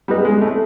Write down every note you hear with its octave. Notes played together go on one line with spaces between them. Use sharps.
G3 B3 E4 G#4 B4 D#5
G#3
A3